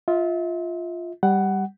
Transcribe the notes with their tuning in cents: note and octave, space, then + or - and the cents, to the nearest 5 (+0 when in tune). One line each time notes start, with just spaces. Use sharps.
F4 +0 E5 -40
G3 +0 F#5 +15